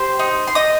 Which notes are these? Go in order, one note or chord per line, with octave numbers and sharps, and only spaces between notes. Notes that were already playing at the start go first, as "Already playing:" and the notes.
Already playing: G4 C5 C6
D#4
C6
D#4 D#5 D#6